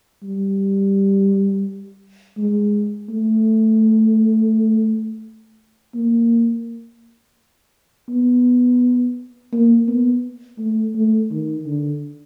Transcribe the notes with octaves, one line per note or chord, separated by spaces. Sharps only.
G3
G#3
A3
A#3
B3
A#3
B3
A3
A3
D#3
D3